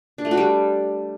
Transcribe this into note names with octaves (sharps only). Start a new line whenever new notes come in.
D4
A3
F#4
G3